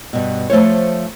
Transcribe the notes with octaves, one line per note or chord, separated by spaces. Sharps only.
G2 B2
F3 A3 C5 C#5